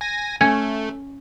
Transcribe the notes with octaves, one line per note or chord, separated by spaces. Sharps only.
G#5 A#6
A3 C#4